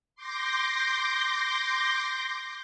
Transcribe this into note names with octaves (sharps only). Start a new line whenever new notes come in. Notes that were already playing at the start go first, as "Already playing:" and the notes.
C6 D6 G6 A#6